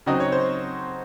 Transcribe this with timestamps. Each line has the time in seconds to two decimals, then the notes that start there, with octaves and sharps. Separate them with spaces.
0.06 C#3 F#3 C4 D#4 D#5
0.20 C#5
0.32 C5